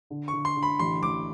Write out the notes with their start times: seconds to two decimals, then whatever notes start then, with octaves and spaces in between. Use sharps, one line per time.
0.10 D3
0.28 D3 C#6
0.45 C6
0.56 D3
0.63 B5
0.79 A1 C6
1.02 A1 D6